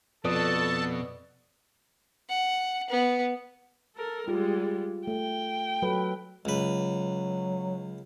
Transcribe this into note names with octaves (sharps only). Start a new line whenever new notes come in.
F2 B2 A4 B4 D5 A5 D#6
F#5
B3
A4 A#4
G3 G#3 F4
A3 G5
F#3 A4 B4
C#2 F#3 B4